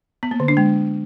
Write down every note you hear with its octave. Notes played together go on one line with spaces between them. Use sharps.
B3
A#3
D3
D4
G#3